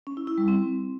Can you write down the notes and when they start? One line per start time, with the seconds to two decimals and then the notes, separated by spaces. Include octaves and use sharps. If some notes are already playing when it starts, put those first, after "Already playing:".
0.07 C#4
0.17 E4
0.27 E4
0.38 G3
0.48 C4